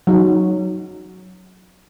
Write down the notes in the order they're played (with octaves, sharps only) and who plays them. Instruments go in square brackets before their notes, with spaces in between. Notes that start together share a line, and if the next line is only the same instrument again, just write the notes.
[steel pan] F#3 D#4